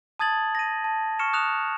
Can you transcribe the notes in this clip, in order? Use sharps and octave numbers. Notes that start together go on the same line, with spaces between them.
A5 D#6 G#6 A6 F#7
A#6 D#7
A5
C#6 F6 C#7 E7
D#6 F#6 E7 F7